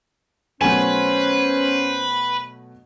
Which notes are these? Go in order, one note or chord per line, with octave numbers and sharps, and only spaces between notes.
B2 F#3 A3 C#4 B4 C5 G#5